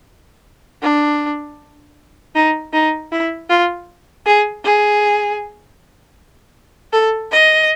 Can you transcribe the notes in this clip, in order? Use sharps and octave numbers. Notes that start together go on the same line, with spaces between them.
D4
D#4
D#4
E4
F4
G#4
G#4
A4
D#5